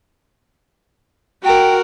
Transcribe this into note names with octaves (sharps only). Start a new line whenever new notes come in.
F#4 A#4 G5